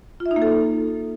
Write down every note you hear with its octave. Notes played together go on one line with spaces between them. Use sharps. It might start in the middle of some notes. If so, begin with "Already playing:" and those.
F4
E5
D#4
A#3
A4